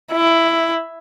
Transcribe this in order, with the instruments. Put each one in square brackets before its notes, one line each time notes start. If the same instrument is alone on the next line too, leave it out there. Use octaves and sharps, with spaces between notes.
[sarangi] E4